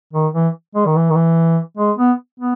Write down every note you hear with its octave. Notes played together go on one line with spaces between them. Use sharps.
D#3
E3
G#3
D#3
E3
D#3
E3
G#3
B3
B3